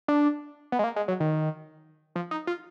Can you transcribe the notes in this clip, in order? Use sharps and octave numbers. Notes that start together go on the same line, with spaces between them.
D4
B3
G#3
A#3
G#3
F#3
D#3
F3
D#4
F4